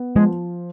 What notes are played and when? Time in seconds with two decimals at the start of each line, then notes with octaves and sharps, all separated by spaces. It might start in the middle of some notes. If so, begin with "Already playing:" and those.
Already playing: B3
0.16 F3 G#3